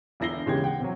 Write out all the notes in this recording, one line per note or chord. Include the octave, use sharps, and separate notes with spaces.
E1 D3 E4 A#6 C7 G7
D#2 C#3 E3 G#3 G4 G#6
F#5 G5
C3 F#3